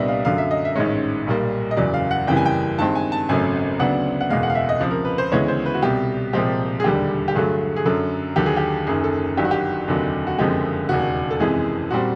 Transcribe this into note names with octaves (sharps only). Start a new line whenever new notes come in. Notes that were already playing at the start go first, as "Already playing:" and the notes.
Already playing: C2 A#2 G3 B3 D4 D#5 E5
F5
F#2 D3 F#3 F5
E5
D#5
E5
A1 G#2 D#3 G#3 C#4
B1 A#2 G3 A#3
D#5
F#1 E2 C#3 F#3 D5
F5
F#5
F#1 F2 C#3 E3 G3 G5
G#5
G5
G2 D#3 G#3 C4 A5
G#5
A5
G#1 F#2 C#3 F#3 A3 G#5
D2 C#3 F#3 B3 D4 F#5
F#5
F#1 E2 B2 G#3 F5
F#5
F5
E5
D#5
C#2 C3 F3
A#4
B4
C5
D2 C#3 E3 G#3 B3 C#5
C5
B4
F#4
C2 B2 G3 G4
C2 A#2 F3 G#3 C4 G4
G#4
E1 D#2 D3 G3 G4
G4
G2 D3 F#3 A3 G#4
G#4
F#2 D3 F#3 A4
D#2 D3 F#3 G4
G#4
G4
F#1 F#2 D#3 G#4
A4
G1 G2 D#3 F#3 G4
F#4
G4
F1 D#2 D3 F#3
F#4
F#1 F2 D3 F3 G#3 G4
E1 D#2 C#3 F#4
A4
F#1 F2 C3 E3 G#3 G#4
A#2 G3 C4 F#4